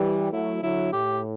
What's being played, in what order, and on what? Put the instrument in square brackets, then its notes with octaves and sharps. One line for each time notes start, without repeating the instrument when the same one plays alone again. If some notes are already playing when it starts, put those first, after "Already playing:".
Already playing: [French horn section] E3 G3
[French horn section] F#3 A3 [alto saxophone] E4
[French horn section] D3 F#3 [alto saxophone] E4
[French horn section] A2 [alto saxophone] G4